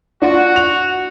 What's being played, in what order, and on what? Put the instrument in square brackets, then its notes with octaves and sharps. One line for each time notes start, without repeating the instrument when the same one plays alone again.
[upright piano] D4 F4 [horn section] F#4
[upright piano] F7